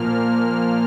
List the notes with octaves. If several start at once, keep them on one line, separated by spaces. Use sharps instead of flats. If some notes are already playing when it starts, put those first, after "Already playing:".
Already playing: A#2 F3 A#3 F6